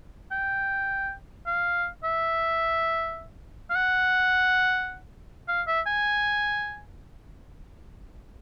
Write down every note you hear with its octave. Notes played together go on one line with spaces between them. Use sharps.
G5
F5
E5
F5
F#5
F5
E5
G#5